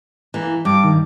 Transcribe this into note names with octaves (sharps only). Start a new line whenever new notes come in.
E3 A#3
G2 D6
D#3